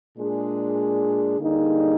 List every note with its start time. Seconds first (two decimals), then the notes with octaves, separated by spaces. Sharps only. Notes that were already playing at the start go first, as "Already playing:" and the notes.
0.17 A#2 G#3 D4 G#4
1.38 D3 G3 A#3 D#4 G#4